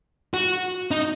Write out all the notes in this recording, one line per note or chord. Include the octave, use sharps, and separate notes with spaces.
F#4
D#4